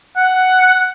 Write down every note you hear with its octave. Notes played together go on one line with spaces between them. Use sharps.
F#5